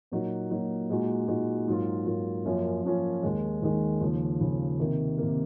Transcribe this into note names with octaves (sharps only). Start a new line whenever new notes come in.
A#2 F#3 A#3 D#4 F#4
A#2 F#3 A#3 D#4 F#4
A#2 G#3 D#4 F#4
A#2 G#3 D#4 F#4
G#2 F#3 A#3 F4
G#2 F#3 A#3 F4
F#2 F3 A#3 C#4 F4
F#2 F3 A#3 C#4 F4
D#2 D#3 G#3
D#2 D#3 G#3
D#2 C#3 F3
D#2 C#3 F3
C3 D#3 A#3
C3 D#3 A#3